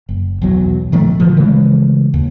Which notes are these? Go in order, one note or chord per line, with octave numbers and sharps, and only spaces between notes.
F#1
B1 E2 F#3
A#2 D#3 F3 A3
A#2 D3 E3 F3
C#3 E3 G#3 A3
D#2